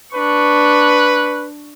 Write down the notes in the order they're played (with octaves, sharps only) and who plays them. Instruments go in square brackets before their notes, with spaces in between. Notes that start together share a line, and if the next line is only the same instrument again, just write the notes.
[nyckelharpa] D4 C#6 [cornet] B4